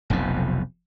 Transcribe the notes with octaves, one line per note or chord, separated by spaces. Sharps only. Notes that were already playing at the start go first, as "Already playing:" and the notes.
F1 B1 F2 C3